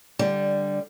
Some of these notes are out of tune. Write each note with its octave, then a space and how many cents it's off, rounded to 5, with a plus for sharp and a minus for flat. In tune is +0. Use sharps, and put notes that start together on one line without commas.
D3 +0 G3 +5